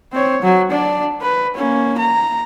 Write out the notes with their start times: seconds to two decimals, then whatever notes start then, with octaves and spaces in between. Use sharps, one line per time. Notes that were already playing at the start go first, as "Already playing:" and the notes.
0.12 C4 C#5
0.42 F#3
0.71 D4 D5
1.21 B4
1.56 A#3 C#4
1.98 A#5